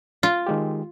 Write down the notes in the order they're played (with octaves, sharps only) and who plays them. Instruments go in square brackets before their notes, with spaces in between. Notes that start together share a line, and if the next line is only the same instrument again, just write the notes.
[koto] F4
[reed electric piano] D#3 G#3 G4